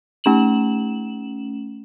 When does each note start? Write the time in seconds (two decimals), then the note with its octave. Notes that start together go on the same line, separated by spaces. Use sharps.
0.24 A3 C#4 E7 F#7